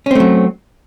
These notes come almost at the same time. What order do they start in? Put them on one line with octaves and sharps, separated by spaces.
C#4 C4 A3 F#3